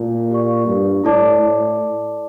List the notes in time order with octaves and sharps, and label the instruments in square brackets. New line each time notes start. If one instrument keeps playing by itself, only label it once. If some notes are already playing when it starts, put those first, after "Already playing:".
Already playing: [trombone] A#2 [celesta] E4 A4 D5 A5
[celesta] G4 D5 F5 C#6
[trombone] G2
[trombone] A2 [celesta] E4 A4 D5 A5 D6
[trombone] A2